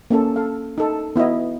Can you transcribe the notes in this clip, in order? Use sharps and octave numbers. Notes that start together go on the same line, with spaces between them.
A#3 C#4 A4
A4 F5
D#4 A4
B3 E4 F#4 D#5